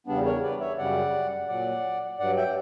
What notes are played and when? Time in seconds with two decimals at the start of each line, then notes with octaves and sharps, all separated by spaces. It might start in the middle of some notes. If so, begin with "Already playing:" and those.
0.07 E2 C#3 G3 B3 D4
0.25 A#4 C#5
0.42 B4 D5
0.60 C#5 E5
0.77 F#2 C#3 G3 D5 F#5
1.48 A#2 F#3 D5 F#5
2.19 G2 F#3 D5 F#5
2.37 E5 G5